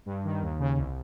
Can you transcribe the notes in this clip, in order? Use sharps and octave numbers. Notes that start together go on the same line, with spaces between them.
G2
D#3
D#2
C#3
C2